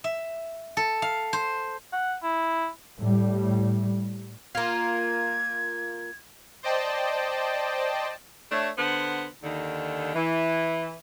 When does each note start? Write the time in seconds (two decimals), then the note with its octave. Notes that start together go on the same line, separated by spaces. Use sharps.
0.04 E5
0.77 A4
1.02 F5
1.33 C5
1.93 F#5
2.23 E4
3.02 A2 G3
4.55 A#3 F4 G#6
6.63 C5 D5 D#5 G5 A5
8.52 A3 D4 C#5 E5
8.78 D3 B3 C5 F#5
9.44 D#2 D3 D#3
10.15 E3